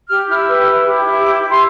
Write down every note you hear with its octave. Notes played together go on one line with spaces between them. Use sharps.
G4 F6
E4 F6
E6
B4
E4
G4
E4
G4 D6
E4
C6